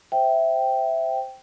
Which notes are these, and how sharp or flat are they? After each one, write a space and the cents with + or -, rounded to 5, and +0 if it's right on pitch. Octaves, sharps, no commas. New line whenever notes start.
C5 +0 E5 +0 G5 -10